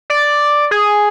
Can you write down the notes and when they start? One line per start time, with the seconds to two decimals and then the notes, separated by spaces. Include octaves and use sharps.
0.10 D5
0.71 G#4